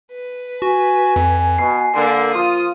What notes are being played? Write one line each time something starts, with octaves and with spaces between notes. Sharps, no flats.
B4
F#4 G#5
F2
B2 C7
D3 A#3 A#4
F3 F4 D#6